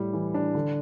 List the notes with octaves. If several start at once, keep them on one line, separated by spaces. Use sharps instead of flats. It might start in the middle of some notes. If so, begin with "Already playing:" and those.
Already playing: A2 G3
E3
D4
D3